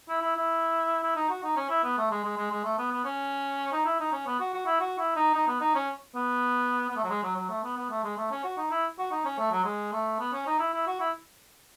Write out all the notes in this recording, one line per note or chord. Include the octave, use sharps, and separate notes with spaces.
E4
E4
E4
E4
D#4
F#4
D#4
C#4
E4
B3
A3
G#3
G#3
G#3
G#3
A3
B3
B3
C#4
D#4
E4
D#4
C#4
B3
F#4
F#4
E4
F#4
E4
D#4
D#4
B3
D#4
C#4
B3
B3
A3
F#3
G#3
F#3
F#3
A3
B3
B3
A3
G#3
A3
C#4
F#4
D#4
E4
F#4
D#4
C#4
A3
F#3
G#3
A3
B3
C#4
D#4
E4
E4
F#4
E4